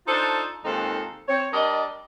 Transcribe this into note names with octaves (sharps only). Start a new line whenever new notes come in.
D4 D#4 F4 A4 C5
D#2 G#3 C4 D#4 F4 A4
C4 C#5
G3 D4 A#4 D5 D#5